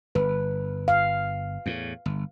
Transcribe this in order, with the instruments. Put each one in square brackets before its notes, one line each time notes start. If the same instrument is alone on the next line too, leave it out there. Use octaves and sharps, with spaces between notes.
[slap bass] G1 [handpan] B4
[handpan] F5
[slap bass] E2 A2
G1